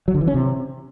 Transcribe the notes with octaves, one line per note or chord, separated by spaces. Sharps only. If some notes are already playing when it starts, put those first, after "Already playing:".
F#3
D3
E3
C#4
C3